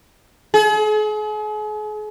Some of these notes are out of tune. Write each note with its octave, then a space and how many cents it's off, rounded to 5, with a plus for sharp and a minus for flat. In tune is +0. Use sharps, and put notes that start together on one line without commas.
G#4 +40